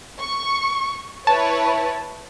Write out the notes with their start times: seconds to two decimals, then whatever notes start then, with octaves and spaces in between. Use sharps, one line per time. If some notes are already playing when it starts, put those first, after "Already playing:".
0.20 C#6
1.27 E4 B4 C#5 A5